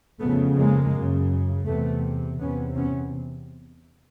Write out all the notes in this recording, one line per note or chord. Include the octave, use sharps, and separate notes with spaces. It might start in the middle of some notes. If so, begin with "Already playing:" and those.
F2 C#3 A3 B3
G#3 A#3
F#2
C#3
E2 C3 A3 B3
E2 C3 B3 C#4
B3 C#4